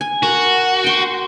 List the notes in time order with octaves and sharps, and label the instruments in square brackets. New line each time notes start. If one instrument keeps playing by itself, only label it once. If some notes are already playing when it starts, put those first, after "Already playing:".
[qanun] G#5
[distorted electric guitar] F#4 [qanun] A#4
[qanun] G5 C6